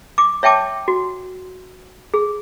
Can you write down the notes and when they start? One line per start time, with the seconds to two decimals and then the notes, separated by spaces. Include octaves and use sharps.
0.18 D6
0.43 C#5 E5 G5 A5 D6
0.88 F#4
2.14 G#4